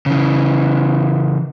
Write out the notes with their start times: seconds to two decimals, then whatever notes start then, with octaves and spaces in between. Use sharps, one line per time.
0.06 C#3 E3